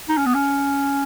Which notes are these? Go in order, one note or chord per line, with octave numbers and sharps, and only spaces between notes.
D#4
C#4
B3
C#4